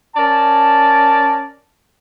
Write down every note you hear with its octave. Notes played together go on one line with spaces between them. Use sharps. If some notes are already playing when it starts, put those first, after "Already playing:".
C#4 A#4 D5 A5